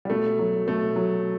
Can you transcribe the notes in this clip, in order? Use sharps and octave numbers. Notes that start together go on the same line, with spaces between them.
G3
B2 A3
F#3
B2 A3
F#3